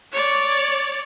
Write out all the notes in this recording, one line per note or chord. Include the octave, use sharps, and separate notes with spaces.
C#5 D5